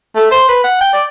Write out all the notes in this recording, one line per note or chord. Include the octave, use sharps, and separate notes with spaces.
A3
C5
B4
F#5
G5
D5